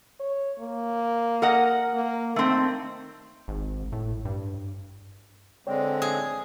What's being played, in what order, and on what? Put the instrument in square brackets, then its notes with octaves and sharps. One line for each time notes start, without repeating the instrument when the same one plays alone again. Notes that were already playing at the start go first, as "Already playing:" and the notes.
[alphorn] C#5
A#3
[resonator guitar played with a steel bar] A#4 D#5 F#5
[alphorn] A#3
[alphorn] D#3 [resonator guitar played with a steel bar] A3 C4
[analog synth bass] G#1
A2
G2
[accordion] D3 G#3 C4 [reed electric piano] C#5 D5 G5
[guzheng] G#4